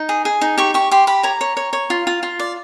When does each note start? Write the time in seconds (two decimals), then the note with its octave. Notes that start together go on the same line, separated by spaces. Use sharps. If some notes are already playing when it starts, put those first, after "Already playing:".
Already playing: D#4
0.09 G#4
0.25 G#4
0.41 D#4
0.58 G4 C#6
0.74 G4 C#6
0.92 G4 C6
1.07 G4 B5
1.23 C#5 A#5
1.41 C#5
1.57 C#5
1.73 C#5
1.90 F4
2.07 F4
2.23 F4
2.40 D5